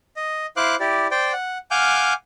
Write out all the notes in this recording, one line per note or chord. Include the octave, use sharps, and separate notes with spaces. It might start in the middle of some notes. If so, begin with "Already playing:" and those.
D#5
E4 C5 F5 D6 F#6
E4 G4 D5
C5 D5 G5
F#5
F5 F#5 G#5 D6 F6 G6